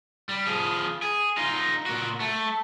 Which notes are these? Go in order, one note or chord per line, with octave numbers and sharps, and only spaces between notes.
G3
F3 G#4
G#4
D#4 F4
A#2 F#4
A3